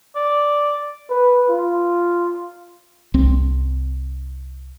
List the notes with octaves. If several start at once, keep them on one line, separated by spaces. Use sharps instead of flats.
D5
B4
F4
C2 C4